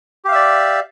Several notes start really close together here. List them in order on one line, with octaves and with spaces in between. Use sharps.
G4 F5 E5 D5